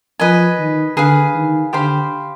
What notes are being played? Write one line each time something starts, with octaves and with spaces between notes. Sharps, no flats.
F3 B4 D#5 G#5
D#3
D3 G#4 B4 F5
D#3
D3 G4 C5 F5 B5